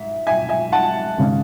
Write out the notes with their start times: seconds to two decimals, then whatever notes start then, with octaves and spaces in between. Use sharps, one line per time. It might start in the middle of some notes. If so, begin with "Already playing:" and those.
Already playing: G#2 E5
0.27 E5 G#5
0.49 E5 G#5
0.72 F#5 A5
1.18 G#1 C#3 G#3 C#4